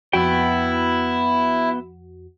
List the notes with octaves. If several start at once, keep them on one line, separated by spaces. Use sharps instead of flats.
F2 B3 E4 F#4 G5